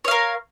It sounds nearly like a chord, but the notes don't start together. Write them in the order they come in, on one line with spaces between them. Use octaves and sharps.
C#5 F5 A#4